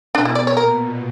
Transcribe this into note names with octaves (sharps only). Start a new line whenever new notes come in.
B2 D4
E4
D5
C#5
A#2 A#4